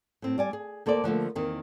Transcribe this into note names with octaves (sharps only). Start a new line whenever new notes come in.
A2 C4
G3 D5 G#5
G#4
D2 A#3 A4 C5 D5
D3 F3 A3 A#3
E2 D#3 A#3 C4